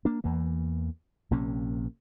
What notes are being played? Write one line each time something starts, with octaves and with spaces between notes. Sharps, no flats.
A#3 D4
E2 E3 A#3
A#1 C3 A#3 C#4